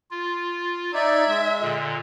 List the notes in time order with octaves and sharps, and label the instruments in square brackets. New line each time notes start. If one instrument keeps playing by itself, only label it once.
[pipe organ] F4
[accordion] D#4 D5 [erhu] E5 [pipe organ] G#6
[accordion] G#3
[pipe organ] A#2 D3